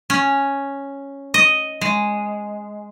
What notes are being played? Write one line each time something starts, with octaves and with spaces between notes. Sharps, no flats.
C#4
D#5
G#3